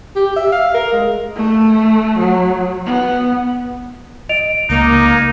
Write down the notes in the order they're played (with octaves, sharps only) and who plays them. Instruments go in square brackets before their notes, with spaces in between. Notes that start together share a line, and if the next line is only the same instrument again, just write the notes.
[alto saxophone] G4
E5
F5
A#4
G#3
[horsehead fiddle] A3
F#3
B3
[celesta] D#5 D7 F7
[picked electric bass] C#2 [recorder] A#3 [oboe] D#4